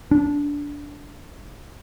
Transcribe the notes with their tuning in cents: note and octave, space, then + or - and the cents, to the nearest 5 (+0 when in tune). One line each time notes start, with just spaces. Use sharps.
D4 -15